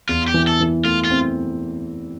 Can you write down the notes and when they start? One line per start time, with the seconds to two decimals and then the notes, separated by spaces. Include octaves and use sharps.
0.09 E2 F4
0.28 G4
0.34 E3
0.47 A4
0.60 E3
0.85 A3 F4
1.05 F4
1.10 C4